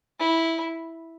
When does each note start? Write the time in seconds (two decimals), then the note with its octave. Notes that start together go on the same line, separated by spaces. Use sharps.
0.19 E4